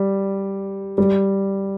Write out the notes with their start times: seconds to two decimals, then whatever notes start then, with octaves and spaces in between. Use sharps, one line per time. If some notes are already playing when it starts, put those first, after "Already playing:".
Already playing: G3
0.98 G3